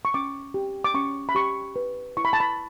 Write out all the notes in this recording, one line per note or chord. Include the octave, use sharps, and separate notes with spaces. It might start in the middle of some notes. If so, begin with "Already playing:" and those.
C#6
C#4 D6
G4
D6
C#4 C#6
B5
G4 C#6
B4
E4 C#6
B5
A5
B5